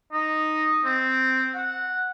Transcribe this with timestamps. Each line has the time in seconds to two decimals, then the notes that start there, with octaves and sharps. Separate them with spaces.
0.13 D#4
0.85 C4
1.55 F#5